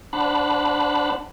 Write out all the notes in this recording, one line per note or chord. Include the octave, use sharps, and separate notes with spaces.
D4 C5 F#5 A5 B5 F#6